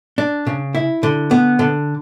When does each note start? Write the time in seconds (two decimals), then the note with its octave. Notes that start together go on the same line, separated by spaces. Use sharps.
0.18 D4
0.47 C#3
0.75 E4
1.03 D3
1.31 B3
1.59 D3